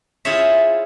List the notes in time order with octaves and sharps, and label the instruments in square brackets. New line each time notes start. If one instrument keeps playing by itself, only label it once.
[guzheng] E4 F4 G#4 C5 C#5 E5